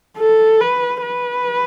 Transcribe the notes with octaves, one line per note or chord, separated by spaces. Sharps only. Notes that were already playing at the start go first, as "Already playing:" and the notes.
A4
B4
B4